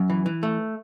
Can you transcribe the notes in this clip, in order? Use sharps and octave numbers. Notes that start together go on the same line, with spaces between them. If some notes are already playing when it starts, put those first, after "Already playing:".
Already playing: F#2
E3
E3
A3